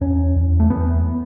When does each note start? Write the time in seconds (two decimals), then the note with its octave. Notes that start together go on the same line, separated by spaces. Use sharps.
0.01 E2 C#4
0.36 E2
0.60 A3
0.70 E2 B3